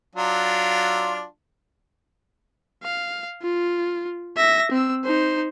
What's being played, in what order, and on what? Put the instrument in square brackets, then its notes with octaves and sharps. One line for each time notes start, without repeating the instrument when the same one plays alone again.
[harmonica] F#3 D4 F4
[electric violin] F5
F4
E5 A#6
C4 E6
D#4 C5